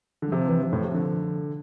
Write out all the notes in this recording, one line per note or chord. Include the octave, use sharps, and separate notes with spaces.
D3
G3
C3 F3
E3
C3 F3
A2
C3
D3